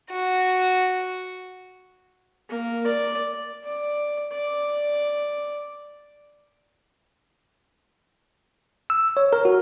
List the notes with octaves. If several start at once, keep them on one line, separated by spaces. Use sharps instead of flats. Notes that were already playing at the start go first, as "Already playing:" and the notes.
F#4
A#3
D5
D5
D5
E6
C#5
A#4
F#4